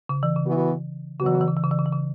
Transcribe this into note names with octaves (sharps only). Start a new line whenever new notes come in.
C#3
E3
C#3
E3 B3 F#4
C#3 F#3 B3 F#4
E3
C#3
E3
C#3
E3
C#3
E3
C#3
E3
C#3